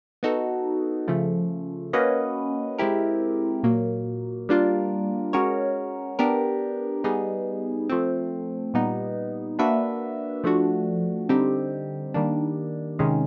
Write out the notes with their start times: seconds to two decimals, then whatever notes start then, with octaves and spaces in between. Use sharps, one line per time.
0.23 B3 D#4 F#4 A4
1.08 C#3 F3 A3
1.93 A#3 C#4 F#4 B4 D#5
2.78 G#3 C4 E4 G4 A#4
3.63 A#2 F#3 A#3
4.49 G3 A#3 D4 F4 A#4
5.33 G#3 C#4 F#4 A#4 C#5
6.19 B3 D4 G4 A#4
7.04 G3 B3 D#4 G#4
7.89 F3 A3 C4
8.74 A#2 G3 B3 D#4
9.59 A#3 D4 F#4 B4 E5
10.44 F3 A3 D4 F#4
11.29 D3 G3 C4 D#4 G4
12.14 D#3 G3 A#3 D4
12.99 C3 D#3 G#3 C#4